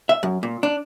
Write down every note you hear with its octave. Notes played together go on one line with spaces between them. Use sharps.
E5
F#2
A#2
D4